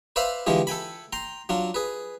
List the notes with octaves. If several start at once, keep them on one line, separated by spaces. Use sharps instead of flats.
B4 C5 D5 E5 F5 B5
D3 E3 G#3 F4 G4
A4 G5 G#5 B5
G5 A#5 C6
F#3 D4 F4
G#4 B4